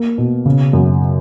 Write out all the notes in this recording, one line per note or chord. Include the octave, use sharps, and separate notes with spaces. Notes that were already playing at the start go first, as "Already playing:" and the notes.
Already playing: A#3
B2
C#3
F#2